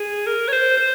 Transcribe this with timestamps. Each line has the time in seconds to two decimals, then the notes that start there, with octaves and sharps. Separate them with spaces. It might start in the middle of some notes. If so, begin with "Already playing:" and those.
Already playing: G#4
0.26 A#4
0.48 C#5
0.52 C5
0.77 C5